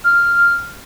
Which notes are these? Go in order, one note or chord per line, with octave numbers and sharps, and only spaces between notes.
F6